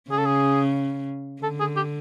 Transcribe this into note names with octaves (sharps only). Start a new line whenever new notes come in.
C#3 G#4
A4
G#4
D3 A4
G#4
G4